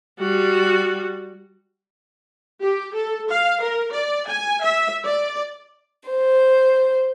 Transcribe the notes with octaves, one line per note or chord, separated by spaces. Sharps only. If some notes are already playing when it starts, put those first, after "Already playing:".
G3 F#4
G4
A4
F5
A#4
D5
G#5
E5
D5
C5